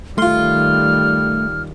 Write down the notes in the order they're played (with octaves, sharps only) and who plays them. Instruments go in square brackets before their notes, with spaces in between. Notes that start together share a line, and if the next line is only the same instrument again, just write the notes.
[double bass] D#3 G3 [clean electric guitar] A3 [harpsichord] F4 C6 [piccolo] F6